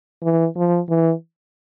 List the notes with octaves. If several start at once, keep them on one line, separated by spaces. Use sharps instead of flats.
E3
F3
E3